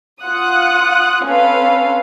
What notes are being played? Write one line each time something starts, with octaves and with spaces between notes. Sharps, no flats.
F4 F#5 D#6 F#6
C4 C#4 A4 B4 F5